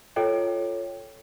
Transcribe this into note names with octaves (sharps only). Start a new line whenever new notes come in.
F4 A4 C#5 D#5 G5